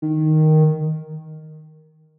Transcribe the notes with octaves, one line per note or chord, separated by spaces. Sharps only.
D#3